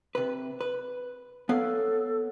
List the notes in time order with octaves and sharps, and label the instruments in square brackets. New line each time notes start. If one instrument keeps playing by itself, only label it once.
[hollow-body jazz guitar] C3 B4
B4
[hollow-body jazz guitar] B3 C#5 F5 [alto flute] A4